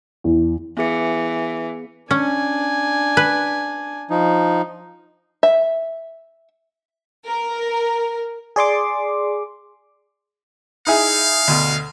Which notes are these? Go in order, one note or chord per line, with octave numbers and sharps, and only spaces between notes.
E2
E3 B3 G#4 C#7
C#4 D4 G#5
B4
F3 D#4
E5
A#4
G#4 D5 C6 D6
D#4 E4 G#4 F5
D2 B2